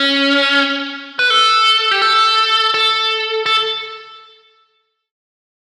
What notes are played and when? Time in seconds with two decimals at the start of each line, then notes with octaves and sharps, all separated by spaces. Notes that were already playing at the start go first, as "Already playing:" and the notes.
Already playing: C#4
1.19 B4
1.30 A4
1.91 G4
2.02 A4
2.74 A4
3.46 A4